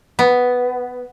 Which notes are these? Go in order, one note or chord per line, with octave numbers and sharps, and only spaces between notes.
B3